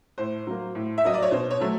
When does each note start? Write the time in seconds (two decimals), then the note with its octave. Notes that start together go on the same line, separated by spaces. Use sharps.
0.18 A2 C5
0.47 F#3 A#3
0.75 A2
0.98 E5
1.03 F#3 A#3 D#5
1.14 D5
1.22 C#5
1.31 B2 C5
1.50 C#5
1.60 F#3 A3